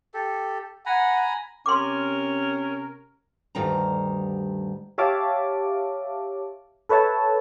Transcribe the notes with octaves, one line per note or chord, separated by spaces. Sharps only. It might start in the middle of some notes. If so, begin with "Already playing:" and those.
G4 A4
F#5 G#5 A#5 B5
C3 C#4 A#4 C6 D6
D2 G2 D#3 G3 A#5
G4 C#5 E5 F5 A5 D6
A4 B4 C#5 E5 A5